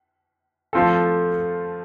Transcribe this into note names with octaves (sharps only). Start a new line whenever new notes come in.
F3 A3 C4 F4 A4